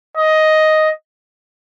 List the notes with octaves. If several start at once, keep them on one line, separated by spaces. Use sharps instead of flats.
D#5